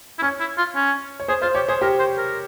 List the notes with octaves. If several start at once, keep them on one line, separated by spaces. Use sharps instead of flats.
E4
C#4 C#5
E4
F4
C#4
C#5
G#4 C5
F4 C5
G4 C#5
G#4 C5
G4 A#4
C5
A#4